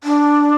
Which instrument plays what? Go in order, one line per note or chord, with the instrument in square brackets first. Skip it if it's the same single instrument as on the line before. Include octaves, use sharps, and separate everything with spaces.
[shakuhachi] D4